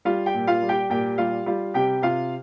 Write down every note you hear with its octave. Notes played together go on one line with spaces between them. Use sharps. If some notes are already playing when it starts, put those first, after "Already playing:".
G3 F4 F5
G4 G5
A#2
F4 F5
G3
G4 G5
A#2 G4 G5
G3 F4 F5
G3 F4 F5
C3 G4 G5
C3 F4 F5